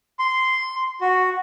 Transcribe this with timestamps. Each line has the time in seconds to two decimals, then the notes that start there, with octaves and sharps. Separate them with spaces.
0.19 C6
1.01 F#4